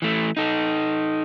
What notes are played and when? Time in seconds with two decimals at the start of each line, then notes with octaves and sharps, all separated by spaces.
0.02 E3 A3
0.37 D#4 A4